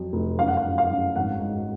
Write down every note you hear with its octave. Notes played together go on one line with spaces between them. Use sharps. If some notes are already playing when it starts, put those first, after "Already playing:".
Already playing: F2 F#3
F1
F#2 F5
F#5
F5
F#2
F5
F#2
G#1 F#5
G#2